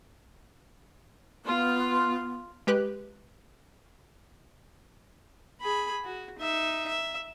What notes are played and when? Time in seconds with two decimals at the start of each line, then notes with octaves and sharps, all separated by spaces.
1.45 B3 F4
2.67 G#3 G4 B4 F#6
5.61 G#4 B5
6.04 F#4
6.39 D#4 E5
6.88 E5